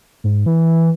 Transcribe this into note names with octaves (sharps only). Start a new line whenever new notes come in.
G#2
E3